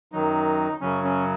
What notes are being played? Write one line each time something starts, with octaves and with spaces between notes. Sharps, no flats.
F#2 D#3 F#3 D#4
F#2 C#3 F#3 C#4
C#4